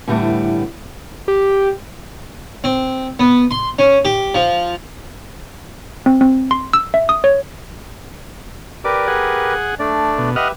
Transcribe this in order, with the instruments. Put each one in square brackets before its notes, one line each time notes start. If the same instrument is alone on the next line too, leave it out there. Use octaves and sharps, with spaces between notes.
[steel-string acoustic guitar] A2 D3 E3 G3 A3 B3
[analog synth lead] G4
[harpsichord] C4
B3
C6
C#4
G4
F3
[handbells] C4
C4
C6
E6
E5
D#6
C#5
[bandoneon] G4 A#4 B4 [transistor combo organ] D5
[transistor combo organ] G#4 F#5
[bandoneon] A3 D4 D5
[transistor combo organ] B2
[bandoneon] G4 B4 E5 [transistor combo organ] D#5 F#5 F6